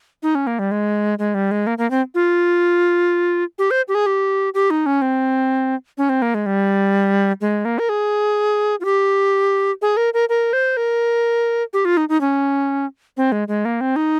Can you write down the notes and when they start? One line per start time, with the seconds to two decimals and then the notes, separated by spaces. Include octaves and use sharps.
0.23 D#4
0.35 C#4
0.47 A#3
0.59 G3
0.71 G#3
1.19 G#3
1.34 G3
1.51 G#3
1.67 A#3
1.78 A#3
1.91 C4
2.15 F4
3.59 G4
3.71 C5
3.88 G4
3.95 G#4
4.06 G4
4.54 G4
4.70 D#4
4.86 C#4
5.02 C4
5.98 C#4
6.09 C4
6.22 A#3
6.34 G#3
6.46 G3
7.41 G#3
7.65 A#3
7.79 A#4
7.89 G#4
8.81 F4
8.85 G4
9.82 G#4
9.97 A#4
10.14 A#4
10.29 A#4
10.53 C5
10.77 A#4
11.73 G4
11.85 F4
11.97 D#4
12.09 D#4
12.21 C#4
13.17 C4
13.32 G#3
13.48 G#3
13.65 A#3
13.81 C4
13.96 D#4